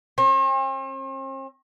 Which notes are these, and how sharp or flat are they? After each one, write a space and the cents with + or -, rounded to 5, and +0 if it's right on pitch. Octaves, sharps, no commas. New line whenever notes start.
C4 +45